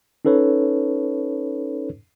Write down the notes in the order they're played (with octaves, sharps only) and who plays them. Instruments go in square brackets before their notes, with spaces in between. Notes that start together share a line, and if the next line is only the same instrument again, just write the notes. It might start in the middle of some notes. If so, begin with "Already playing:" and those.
[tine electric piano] C#4 D#4 A4 B4 C#5